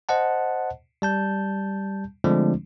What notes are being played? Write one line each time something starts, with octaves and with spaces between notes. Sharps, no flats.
C5 D#5 F#5 A5
G3 A5 G6
D3 F3 G#3 A3 C4 D4